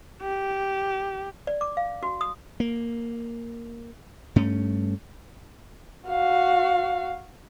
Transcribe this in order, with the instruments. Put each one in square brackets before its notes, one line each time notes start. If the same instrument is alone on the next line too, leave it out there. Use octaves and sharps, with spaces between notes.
[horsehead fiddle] G4
[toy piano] D5
D6
F5
F#4
D#6
[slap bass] A#3
G2 A3 C#4
[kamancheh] F#4 F5